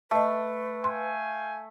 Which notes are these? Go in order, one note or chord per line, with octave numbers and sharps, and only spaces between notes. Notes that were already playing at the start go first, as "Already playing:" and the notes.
A3 B4 D#5 A5
F5 G5 G#5 C6